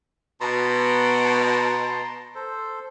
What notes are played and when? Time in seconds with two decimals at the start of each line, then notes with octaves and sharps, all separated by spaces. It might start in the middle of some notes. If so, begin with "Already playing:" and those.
0.41 B2 A5 A#5 C6
2.35 A4 C5